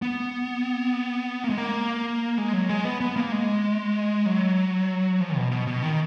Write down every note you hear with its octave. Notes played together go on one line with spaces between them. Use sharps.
B3
A#3
G#3
A#3
G#3
F#3
G#3
B3
B3
A#3
G#3
F#3
F3
B2
B2
B2
D#3